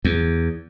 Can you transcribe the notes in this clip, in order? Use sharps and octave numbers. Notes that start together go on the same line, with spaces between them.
E2